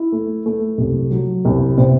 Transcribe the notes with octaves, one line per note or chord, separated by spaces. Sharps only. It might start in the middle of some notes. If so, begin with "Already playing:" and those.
Already playing: E4
A3
A3
C2
F#3
C2
C3